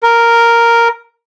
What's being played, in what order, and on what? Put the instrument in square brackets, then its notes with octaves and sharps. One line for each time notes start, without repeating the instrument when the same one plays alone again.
[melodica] A#4